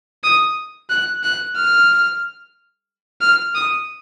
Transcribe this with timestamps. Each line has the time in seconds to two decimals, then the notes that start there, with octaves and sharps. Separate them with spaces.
0.24 D#6
0.90 F#6
1.24 F#6
1.56 F6
3.21 F6
3.55 D#6